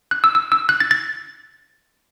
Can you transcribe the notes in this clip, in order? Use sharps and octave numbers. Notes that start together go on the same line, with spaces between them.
F#6
E6
E6
E6
F#6
A6
A6